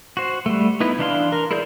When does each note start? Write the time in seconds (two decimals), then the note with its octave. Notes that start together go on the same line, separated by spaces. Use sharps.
0.17 F#4 C5
0.46 G3 A3
0.80 B3 D#4 E4 B4
0.99 E3 D4 F5 C6
1.32 A#4
1.51 E4 G#4 A#4 D5 G6